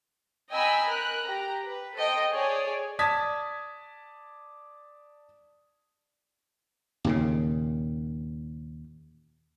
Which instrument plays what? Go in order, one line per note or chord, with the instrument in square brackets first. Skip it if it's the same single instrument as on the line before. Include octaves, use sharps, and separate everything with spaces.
[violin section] D#5 G5 G#5 A#5 B5 E6
A#4 F#6
G4 A#5
B4
A4 C5 D#5 G5
G#4 C#5 D5
[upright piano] D5 A5 D#6 G#6 B6
[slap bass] D#2 A#2 C#3